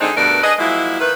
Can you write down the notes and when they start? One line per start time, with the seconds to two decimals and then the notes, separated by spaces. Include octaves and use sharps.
0.01 D3 G#3 C4 D4 D#4
0.17 G2 B2 A3 A#4 B4 D5
0.43 D4 G#4 B4 D#5
0.59 F3 F#3 G#3 A#3 E4
1.00 D#3 B4